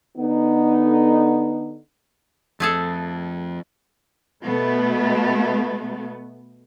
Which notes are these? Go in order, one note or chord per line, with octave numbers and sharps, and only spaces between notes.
D3 B3 D#4
F2 A3 G#4 A4
B2 A3 B3